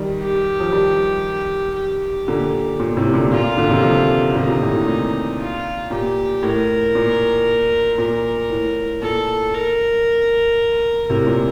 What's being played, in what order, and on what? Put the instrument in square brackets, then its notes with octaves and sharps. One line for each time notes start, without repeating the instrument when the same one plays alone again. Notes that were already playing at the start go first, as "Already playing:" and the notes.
Already playing: [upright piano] D#3 G3
[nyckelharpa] G4
[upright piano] F3
D#3 G3
[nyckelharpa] G4
[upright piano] A#2 D3
A#2
A2 C3
A#2 D3
[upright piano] A#2 [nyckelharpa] F4
[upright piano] A#2 D3
C3 D#3
D3 F3
D3
[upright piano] C3 D#3 [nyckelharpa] D#4
[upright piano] A#2 D3
A2 C3
A2 C3
A#2
[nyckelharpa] F4
[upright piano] A#2 [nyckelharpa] G4
[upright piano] A2 [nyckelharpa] A#4
[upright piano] A#2
[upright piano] A#2 [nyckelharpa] A#4
[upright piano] A2
[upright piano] A#2 [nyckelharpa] A4
[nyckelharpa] A#4
[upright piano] A2 C3 [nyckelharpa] A#4
[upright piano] A#2